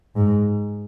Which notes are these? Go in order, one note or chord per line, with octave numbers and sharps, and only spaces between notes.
G#2